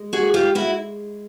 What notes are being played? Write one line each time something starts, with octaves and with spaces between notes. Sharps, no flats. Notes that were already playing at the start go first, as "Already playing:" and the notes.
Already playing: G#3
F#4 G#4
F4 G4
E4 F#4